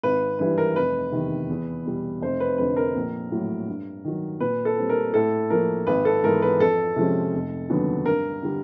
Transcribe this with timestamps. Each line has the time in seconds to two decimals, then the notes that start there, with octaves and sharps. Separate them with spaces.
0.03 G#1 B4
0.39 G2 E3 G3 B4
0.58 A#4
0.76 F1 B4
1.12 E2 C3 D#3
1.49 E2
1.85 B2 G3
2.21 F1 C5
2.40 B4
2.58 F2 D3 B4
2.76 A#4
2.95 A#1
3.31 A2 F#3
3.68 G2
4.04 D#3 F#3
4.40 A#2 B4
4.65 A4
4.77 G3 C4
4.89 A#4
5.14 A2 A4
5.50 F3 A#3 A#4
5.87 G#1 B4
6.05 A4
6.23 G#2 E3 G#3 B3 A#4
6.42 B4
6.60 F2 A4
6.96 C3 F3 G#3 C#4
7.33 F1
7.70 D#2 D3 F#3 B3
8.06 G2 A#4
8.42 D3 G3